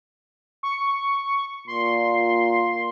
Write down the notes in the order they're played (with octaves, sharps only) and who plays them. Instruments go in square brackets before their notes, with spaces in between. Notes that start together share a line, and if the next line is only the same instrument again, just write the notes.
[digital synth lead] C#6
[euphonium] A#2 [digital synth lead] C6